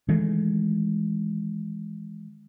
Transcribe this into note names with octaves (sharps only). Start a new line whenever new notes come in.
D#3 E3 G#3 A3